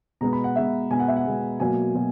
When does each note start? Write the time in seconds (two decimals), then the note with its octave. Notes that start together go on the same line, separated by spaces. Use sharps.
0.21 B2 G#3 B3 A#5
0.33 B5
0.44 F#5
0.56 B2 G#3 B3 E5
0.90 B2 G#3 B3 G#5
1.00 F#5
1.08 E5
1.16 F#5
1.25 B2 G#3 B3
1.60 B2 F#3 A#3 G#5
1.95 B2 F#3